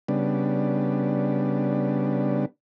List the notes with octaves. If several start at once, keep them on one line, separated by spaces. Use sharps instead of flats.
C#3 G3 B3 D4